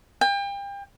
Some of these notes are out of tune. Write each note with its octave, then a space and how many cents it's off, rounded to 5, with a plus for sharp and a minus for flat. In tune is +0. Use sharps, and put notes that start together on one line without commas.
G5 +35